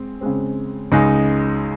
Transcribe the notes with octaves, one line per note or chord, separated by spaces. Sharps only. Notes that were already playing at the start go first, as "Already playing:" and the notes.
Already playing: G#3 C4
C#3 G#3 C4
C#2 C#3 G#3 D#4